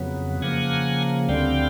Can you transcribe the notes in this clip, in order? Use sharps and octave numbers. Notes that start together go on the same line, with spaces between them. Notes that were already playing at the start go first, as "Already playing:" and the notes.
Already playing: F2 C#3 F#3 B3
C#3 F3 A#3 F#5 G#5
D2 D3 G3 C4 F5 G5